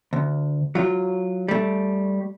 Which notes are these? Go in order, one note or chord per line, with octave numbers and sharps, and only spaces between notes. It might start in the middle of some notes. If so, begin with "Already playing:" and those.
D2
F#3 F4
G3 A3